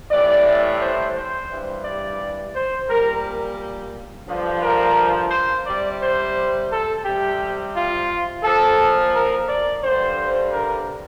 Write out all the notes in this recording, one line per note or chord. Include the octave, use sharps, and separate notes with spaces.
A2 E3 G3 D5
C5
C5
G2 E3 G3
D5
C5
A#2 G3 A#4
G2 D3 F3
A#4
C5
C3 G3 D5
C5
A4
C3 G3 G4
F4
A#2 F3 A4
A#4
D5
G2 D3 G3 C5
A#4